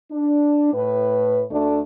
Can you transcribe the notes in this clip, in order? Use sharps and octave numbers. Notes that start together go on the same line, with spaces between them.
D4
A2 B4
D2 A3 D4